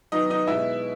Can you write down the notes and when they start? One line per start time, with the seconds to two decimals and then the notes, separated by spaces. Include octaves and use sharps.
0.12 D#3 F#3 B3 D#4 D#5
0.30 D#4 D#5
0.47 B2 G#3 B3 E4 E5